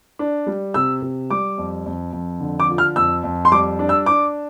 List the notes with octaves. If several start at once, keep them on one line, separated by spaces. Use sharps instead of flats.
D4
G3
C3 E6
C3
G3 D6
F2
F2
F2
D3
D6
F3
F6
F2 E6
F2
C6
G3 D6
D4
E6
D4 D6